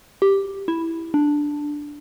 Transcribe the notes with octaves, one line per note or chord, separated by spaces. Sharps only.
G4
E4
D4